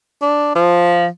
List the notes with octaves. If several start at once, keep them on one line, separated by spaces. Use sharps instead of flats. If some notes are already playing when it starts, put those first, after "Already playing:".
D4
F3